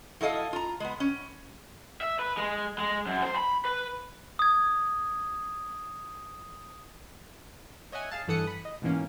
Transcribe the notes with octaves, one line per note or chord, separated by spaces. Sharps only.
F#3 E4 A4 D#5 F5
F4 A#5
G#3 B3
C#4
E5
B4
G#3
G#3
F#2
C5
B5
B4
D#6 G#6
C#5 D#5 E5 F#5 G#5
G#4 F5 A5
G2 E3 A4 F#5 D#6 C#7
B5
D#5
G#2 B2 E3 A#3 C#4